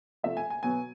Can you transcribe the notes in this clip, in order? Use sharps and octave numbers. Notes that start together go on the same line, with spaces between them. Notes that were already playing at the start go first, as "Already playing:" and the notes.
C3 F3 A3 E5
G#5
G#5
B2 F#3 B3 G#5